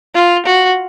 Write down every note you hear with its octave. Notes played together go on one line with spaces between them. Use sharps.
F4
F#4